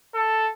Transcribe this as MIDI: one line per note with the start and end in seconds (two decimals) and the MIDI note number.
0.15 0.50 69